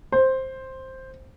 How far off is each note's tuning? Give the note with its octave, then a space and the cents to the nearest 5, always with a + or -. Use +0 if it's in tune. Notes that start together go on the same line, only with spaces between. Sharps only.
C5 +5